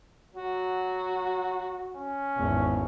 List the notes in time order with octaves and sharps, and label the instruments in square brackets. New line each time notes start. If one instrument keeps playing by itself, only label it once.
[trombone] F#3 [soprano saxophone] F#4
[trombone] C#4
[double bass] G#1 E2